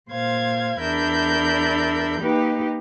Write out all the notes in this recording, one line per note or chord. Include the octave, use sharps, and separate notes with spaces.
A#2 C5 F5 G#6
E2 D4 A#4 E5 B5 G6
A#3 D#4 G4 B4